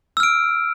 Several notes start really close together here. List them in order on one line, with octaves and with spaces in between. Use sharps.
E6 F6 D7